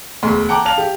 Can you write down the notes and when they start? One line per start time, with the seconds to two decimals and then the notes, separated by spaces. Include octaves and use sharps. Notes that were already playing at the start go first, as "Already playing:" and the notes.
0.23 E1 D2 C6
0.49 F#5 G5 A5 A#5 D6
0.65 F5 A5 F7
0.78 G4